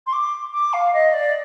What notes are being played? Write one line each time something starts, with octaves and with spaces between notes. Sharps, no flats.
C6
D6
D6
F5
D#5
D5